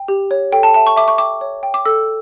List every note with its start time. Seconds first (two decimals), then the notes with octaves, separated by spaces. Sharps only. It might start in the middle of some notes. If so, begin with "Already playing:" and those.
Already playing: G5
0.08 G4
0.31 C#5
0.52 A4 G5
0.63 A5
0.74 E5 A5
0.87 C#6
0.96 E5 D6
1.08 C#6
1.18 G5 D6
1.41 C#5
1.63 G5
1.74 D6
1.85 A4 E6